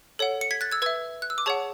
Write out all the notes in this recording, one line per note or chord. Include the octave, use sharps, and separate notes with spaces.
A4 C#5 F#5
C#7
G#6 B6
F#6 A6
E6 G#6
B4 E5 E6 G#6
F#6
E6
D6
G#4 C#5 F#5 A5 C#6